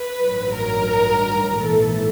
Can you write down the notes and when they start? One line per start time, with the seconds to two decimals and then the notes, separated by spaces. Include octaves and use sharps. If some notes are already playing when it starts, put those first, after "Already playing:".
Already playing: B4
0.21 A1 G2 D#3 F#3
0.55 A#4
1.56 A#1 G#2 E3 A4